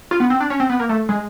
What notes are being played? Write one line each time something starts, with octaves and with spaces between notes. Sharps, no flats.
F4
B3
C4
D4
C#4
C4
B3
A#3
A3
G#3